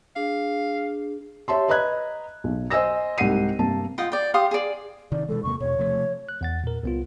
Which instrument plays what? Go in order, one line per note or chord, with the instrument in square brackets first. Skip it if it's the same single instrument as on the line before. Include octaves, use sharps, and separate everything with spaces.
[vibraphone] D4 G#4 [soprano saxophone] F5
[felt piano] G4 C#5 E5 A5 C6
B4 D#5 A#5 B5 F#6 G#6
B1
C5 D#5 G#5 E6 A#6
C2 G#2 G4 F#5 C7 D#7
G2 C3 A#3 A5
[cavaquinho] F4 D#5 F#5 G5
D5 G5
G4 F5 C6 D#6
G#4 D5
[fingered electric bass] C3 D#3 [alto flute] D5
[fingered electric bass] B2 E3 G#3 [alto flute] A4
[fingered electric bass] E2 C3 A#3 [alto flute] C#6
[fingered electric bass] E2 B2 [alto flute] C#5
[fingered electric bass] C3 F3 A3
[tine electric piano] F#6
E2 F#5 A6
A#2 A#4
C2 B3 F4